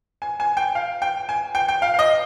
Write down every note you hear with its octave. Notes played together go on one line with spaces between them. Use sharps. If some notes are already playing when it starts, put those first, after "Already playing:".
G#5
G#5
G5
F5
G5
G#5
G5
G5
F5
F5
D#5